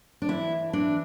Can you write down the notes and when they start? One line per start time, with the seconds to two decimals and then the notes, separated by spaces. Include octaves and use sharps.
0.22 D4
0.29 E3 E4
0.73 E3 D4